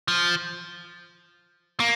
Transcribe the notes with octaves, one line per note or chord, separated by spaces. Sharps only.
F3
A#3